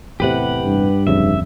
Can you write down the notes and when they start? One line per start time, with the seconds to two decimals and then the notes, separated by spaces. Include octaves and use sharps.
0.20 E2 A2 C3 G4 B4 F#5
0.65 G2
1.07 D1 F2 C#3 E5